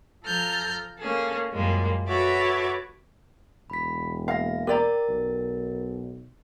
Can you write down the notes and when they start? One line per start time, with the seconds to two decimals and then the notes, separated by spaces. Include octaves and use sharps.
0.23 F3 A4 A#5 F6 G6
0.99 A#3 C#4 G#4 A4
1.52 F#2 A#2 G3 G#3 A#3
2.08 F#4 A4 B4 C#5 E5 D6
3.70 E1 B5 B6
4.28 A#3 F5 A#6
4.67 G4 A#4 D5 A#5 A6
5.09 B1